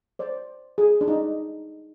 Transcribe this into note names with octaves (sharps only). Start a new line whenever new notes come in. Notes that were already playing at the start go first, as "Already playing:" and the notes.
C5 D5
G#4
D4
D#4